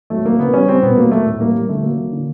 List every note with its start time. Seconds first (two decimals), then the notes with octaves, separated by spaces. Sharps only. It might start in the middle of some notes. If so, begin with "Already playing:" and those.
0.10 F#3 A3
0.25 F#3 A#3
0.39 C#3 B3
0.54 G3 C#4
0.68 G3 C4
0.82 B2 B3
0.97 F#3 A#3
1.11 F#3 A3
1.25 A2
1.40 G3 A#3
1.54 G3
1.69 D3 A3
1.83 F#3 A#3
1.98 F#3
2.13 D3